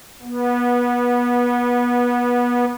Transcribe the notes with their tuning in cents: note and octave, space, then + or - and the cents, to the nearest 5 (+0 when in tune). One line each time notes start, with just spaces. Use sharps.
B3 -25